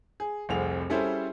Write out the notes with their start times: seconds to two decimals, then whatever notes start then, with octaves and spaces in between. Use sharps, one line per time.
0.20 G#4
0.49 F1 C2 C4 G#4 F7
0.90 G3 C#4 E4 G#4 A4 C5